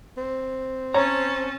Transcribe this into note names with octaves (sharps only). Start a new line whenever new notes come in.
C4
C#4 C#5 A5 A#5